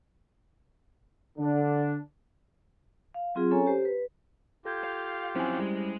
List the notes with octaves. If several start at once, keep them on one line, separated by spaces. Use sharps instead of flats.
D3 D4
F5
F#3 C4 F4 G#4
C#4 A4 C#5 G#5 A#5
G4 C5
B4
F4 G4 A4 G6 G#6
F5
F3 F#3 C4 C#4 E4 C5 G#5
G3 G#3